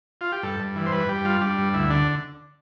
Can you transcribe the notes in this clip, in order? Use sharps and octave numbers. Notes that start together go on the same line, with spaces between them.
F4
G4
G2 A4
G2
E3
C5
G2 B4
G2 G4
G3 F4
G3 D4
G2
D2 E4
D3 D4